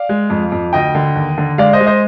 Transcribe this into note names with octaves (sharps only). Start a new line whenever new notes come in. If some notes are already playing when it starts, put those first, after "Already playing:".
Already playing: D5 F5
G#3
F2
F2
D2 D#5 G5
D3
D#2
D3
G#3 D5 F5
C5 D#5
G#3
C5 D#5